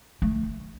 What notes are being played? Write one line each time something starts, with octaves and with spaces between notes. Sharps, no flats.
A3